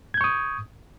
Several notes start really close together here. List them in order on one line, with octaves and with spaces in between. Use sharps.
G#6 G6 C#6 D#6